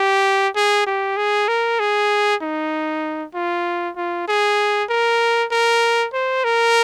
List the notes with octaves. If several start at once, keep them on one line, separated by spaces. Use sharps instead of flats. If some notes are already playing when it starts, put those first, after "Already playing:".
Already playing: G4
G#4
G4
G#4
A#4
G#4
D#4
F4
F4
G#4
A#4
A#4
C5
A#4